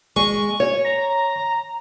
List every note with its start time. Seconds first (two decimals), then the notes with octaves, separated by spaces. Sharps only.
0.16 G#3 C#6
0.60 C#5
0.85 A#5